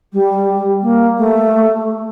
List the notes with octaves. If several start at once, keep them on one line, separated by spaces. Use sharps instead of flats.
G3
A#3
A3